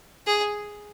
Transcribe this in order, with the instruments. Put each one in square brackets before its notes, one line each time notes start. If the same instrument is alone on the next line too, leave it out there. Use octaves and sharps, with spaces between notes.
[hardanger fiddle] G#4